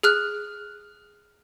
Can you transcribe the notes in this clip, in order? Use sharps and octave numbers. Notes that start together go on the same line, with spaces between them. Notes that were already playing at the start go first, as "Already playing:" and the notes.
G#4 F6 F#6